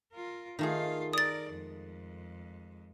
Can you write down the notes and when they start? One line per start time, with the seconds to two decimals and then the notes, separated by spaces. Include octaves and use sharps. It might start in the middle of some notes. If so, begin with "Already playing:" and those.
0.13 F4 A#4
0.59 D#3 A3 F4 G#4 F5
1.13 A#4 D5 D#6 A6
1.51 F2 G#3